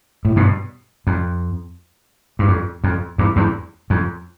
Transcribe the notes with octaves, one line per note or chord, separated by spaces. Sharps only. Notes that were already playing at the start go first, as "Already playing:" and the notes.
A2
G2 B2
F2
G2
F2
F2
E2 G2
E2 G2
F2